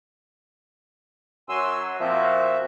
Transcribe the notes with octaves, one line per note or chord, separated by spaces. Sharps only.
F#2 F#3 G#5 C6 E6
A#2 F3 C4 F#4 E5